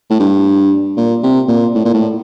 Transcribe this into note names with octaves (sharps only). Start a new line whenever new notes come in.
A2
G2
A#2
C3
A#2
A2
A#2
A2